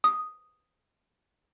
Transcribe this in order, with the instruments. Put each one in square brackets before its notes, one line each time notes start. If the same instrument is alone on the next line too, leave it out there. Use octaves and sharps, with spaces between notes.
[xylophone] D#6